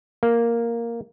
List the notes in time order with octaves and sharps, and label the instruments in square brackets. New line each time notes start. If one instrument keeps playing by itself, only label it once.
[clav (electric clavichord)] A#3